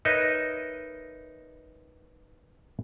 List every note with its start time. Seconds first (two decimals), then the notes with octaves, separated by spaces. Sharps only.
0.05 D#4 A#4 B4 C#5 D#5 E5